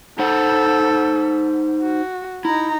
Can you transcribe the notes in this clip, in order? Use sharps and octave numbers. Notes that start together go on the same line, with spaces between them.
D#4 A4 C5 F#5
F#4
D#4 E4 A#5